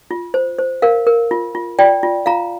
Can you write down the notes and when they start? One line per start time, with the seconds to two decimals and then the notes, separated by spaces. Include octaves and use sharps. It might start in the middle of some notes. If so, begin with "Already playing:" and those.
0.11 F4
0.34 C5
0.59 C5
0.82 A#4 F5
1.07 A#4
1.31 F4
1.55 F4
1.79 F4 D5 G5
2.03 F4
2.26 F4 F5 A#5